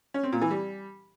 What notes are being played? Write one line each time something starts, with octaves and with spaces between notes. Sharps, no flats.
C#4
C4
A#2
E3
G3